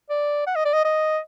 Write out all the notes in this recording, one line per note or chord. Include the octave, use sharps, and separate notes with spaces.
D5
F#5
D#5
D5
D#5
D#5